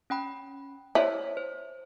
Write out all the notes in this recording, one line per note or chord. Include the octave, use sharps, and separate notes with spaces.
C#4 G5 B5
E4 C5 C#5 B6
C5